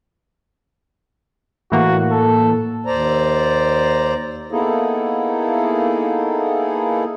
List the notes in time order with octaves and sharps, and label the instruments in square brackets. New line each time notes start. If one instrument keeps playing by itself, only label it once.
[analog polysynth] A2 E3 A#3 [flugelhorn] F#4
[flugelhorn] A4
[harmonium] D#2 C5 D5 A#5
A#3 B3 D#4 E4 G#4 A4